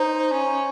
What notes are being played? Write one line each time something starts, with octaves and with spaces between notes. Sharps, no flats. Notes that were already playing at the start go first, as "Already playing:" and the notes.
Already playing: D#4 C5
C#4